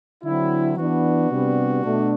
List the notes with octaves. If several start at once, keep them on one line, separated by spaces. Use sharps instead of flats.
D3 F#3 C4 E4
E3 B3 D4 F#4
C3 G3 B3 D4
B2 A3 D4